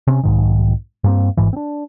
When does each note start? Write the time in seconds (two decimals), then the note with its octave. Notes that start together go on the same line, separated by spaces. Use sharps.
0.07 C3 C4 C#4
0.23 B1 G#2 D#3
1.04 G2 A#3 C4
1.37 G#1 E2 G#2 E3
1.53 C4 D4